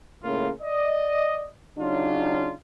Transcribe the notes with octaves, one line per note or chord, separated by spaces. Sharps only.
C#2 A2 C#3 A#3 F4 F5
D5 D#5
C#3 F#3 D4 D#4 F4